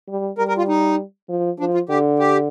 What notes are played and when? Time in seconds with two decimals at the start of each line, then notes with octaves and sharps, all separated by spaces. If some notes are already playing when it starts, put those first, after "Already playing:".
0.08 G3
0.38 G3 A#4
0.48 A#4
0.58 F4
0.68 D#4
1.29 F3
1.59 F3 D4
1.74 F4
1.89 D3 G4
2.19 G4